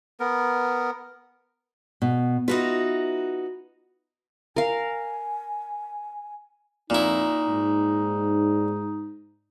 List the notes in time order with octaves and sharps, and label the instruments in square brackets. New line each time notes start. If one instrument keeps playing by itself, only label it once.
[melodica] B3 A#4
[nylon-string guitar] B2
[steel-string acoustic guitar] D#4 F#4 B4 [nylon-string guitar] F4 E5
[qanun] A#4 F5 [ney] G#5
[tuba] F2 [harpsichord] A#2 E4 [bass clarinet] D#4
[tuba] G#2